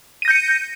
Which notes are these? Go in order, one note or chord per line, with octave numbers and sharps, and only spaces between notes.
G6 A#6 C#7 D#7